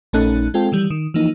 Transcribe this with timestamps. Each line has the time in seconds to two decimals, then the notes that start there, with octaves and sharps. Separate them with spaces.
0.13 A#1 A3 C#4 D#4 A4 F#6
0.54 G#3 C4 F4 A4 G5
0.72 D#3 E3 G3
0.90 D#3
1.14 E3 F3 A#3 D#4